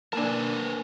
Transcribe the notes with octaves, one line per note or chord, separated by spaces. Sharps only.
A#3 D4 A#4 B4 G#5 A5